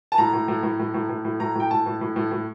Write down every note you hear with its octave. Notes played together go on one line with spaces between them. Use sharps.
A5
A2 A#5
A2
A2
A2
A2
A2
A2
A2
A2 A#5
A2 G5
A2 A5
A2
A2
A2
A2